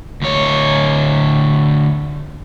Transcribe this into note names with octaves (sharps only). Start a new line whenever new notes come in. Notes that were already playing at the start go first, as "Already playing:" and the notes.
D2 C#5